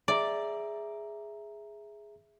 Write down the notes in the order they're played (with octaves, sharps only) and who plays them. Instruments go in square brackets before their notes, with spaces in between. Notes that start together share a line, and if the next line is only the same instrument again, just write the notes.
[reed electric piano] G#4 E5 A#5 [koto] D5